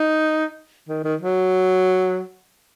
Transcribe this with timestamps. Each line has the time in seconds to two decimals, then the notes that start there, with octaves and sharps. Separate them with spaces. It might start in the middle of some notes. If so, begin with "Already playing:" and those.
Already playing: D#4
0.89 D#3
1.04 D#3
1.21 F#3